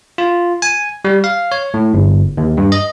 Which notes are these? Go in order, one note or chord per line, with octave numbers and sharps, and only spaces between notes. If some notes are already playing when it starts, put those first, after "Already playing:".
F4
G#5
G3
F5
C#5
A2
G1
D#2
G2
D#5